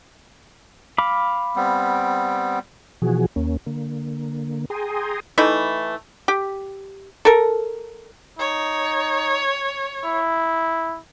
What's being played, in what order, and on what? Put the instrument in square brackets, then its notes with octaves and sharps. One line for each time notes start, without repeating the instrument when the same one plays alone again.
[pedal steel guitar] F5 B5 D6
[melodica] G3 B3 C4
[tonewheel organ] B2 E3 F3 F#4 G#4
D#2 A#3 C#4
D3 A#3
G#4 G5 G#5 A#5 C6 D#6
[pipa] E3 A3 D#4 E4
G4
A4 A#4
[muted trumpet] D#4 [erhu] C#5
[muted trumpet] E4